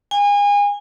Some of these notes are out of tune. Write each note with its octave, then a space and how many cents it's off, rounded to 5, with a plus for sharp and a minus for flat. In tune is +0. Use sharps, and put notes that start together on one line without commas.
G#5 -30